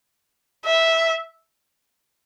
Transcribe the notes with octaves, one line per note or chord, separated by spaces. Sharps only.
E5